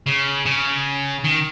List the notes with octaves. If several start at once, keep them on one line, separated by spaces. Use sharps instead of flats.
C#3
C#3
D#3